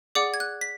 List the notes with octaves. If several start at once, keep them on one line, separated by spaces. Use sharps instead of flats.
G#4 D5 F#5 D6
G#6
F#6
B6